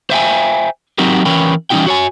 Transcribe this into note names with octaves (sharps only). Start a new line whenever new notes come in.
C5 E5 G5 G#5
F#3 C4 D#4 F#4 G4 A#4
E3 C#4 A#4 B4 C#5 G5
E3 G3 C#4 D#4 F#4 G5
F#4 C#5 G#5